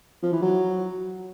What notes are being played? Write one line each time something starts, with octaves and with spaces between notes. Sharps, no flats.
F3
E3
F#3